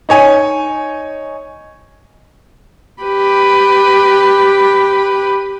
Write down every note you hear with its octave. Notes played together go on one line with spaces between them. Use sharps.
D#4 C#5 G#5
G4 B4